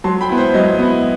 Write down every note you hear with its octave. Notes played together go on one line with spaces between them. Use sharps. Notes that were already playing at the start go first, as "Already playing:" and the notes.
F#3 A5 C6
G5 B5
B3 E4
C5
F#3 D#5
B3 E4